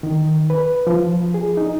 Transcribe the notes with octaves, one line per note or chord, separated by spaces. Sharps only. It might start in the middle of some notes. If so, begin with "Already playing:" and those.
D#3
B4
F3
G#4
D#4